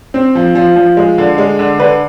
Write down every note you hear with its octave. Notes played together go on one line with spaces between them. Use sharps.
C4
F3
F3
F3
G#3
D3
G#3
D3
D3 B4